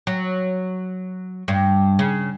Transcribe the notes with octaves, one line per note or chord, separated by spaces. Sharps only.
F#3
G2
C#3